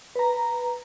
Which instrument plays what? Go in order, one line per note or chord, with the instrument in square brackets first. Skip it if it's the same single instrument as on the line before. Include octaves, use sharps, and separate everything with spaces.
[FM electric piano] B4 A#5